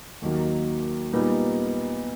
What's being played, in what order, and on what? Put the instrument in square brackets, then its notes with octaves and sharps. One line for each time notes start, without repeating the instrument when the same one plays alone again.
[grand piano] D#2 D#3 F#3 A#3
A#2 G3 B3 D#4